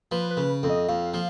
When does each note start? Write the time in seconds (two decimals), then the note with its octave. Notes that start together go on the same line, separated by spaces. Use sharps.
0.12 F3 B4
0.31 B4
0.37 C#3
0.63 F2
0.69 D#5
0.89 F2 F5
1.14 F3 F5